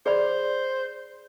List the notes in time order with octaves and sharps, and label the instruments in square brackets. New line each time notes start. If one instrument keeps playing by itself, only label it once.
[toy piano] G#4 D5 B5 [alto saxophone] C5